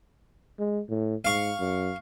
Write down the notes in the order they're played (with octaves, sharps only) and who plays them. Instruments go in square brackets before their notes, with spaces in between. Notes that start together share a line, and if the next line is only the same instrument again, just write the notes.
[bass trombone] G#3
A2
[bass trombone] G#2 [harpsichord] F5 C#6
[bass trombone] F#2